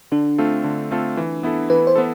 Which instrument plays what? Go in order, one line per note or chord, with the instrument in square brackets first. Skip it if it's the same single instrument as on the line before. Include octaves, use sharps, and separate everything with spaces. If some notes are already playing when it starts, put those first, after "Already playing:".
[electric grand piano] D3 [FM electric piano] D4
[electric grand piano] A3 C4 F4 A4
D3
A3 C4 F4 A4
E3
B3 E4 A4
[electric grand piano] E3 [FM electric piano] B4
[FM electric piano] C5
[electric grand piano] B3 E4 A4